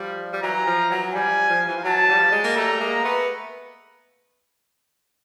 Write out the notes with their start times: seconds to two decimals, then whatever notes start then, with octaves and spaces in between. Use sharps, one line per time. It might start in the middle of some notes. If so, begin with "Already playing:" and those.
Already playing: F3 G3
0.33 G3
0.43 E3 F#3 A#5
0.66 F3
0.90 E3 F#3
1.14 F3 G3 G#5
1.49 F3
1.68 E3
1.76 F3
1.84 E3 F#3 A5
2.09 F3 G3
2.32 F#3 G#3
2.44 A#3
2.56 G3 A3 A#5
2.80 G#3 A#3
3.03 A3 B3